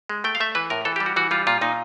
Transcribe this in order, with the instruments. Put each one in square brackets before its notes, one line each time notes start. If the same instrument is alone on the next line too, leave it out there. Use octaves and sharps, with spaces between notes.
[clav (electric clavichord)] G#3
A3 G5
F5
A3 E5
E3 B4
A2 A#4
E3 A4
G4
G3
F#4
E3 F#4
G3 F4
A#2 F4
A#2 D#4